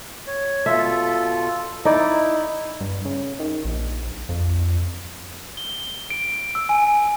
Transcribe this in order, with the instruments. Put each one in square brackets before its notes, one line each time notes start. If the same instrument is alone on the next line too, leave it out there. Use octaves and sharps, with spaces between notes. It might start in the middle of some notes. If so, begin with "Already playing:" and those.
[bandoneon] C#5
[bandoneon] B2 F4 A4 [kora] E5
[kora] D#4 D5 [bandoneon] E4
[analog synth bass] G2
C#3
D#3
A#1
F2
[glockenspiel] G7
D7
E6
G#5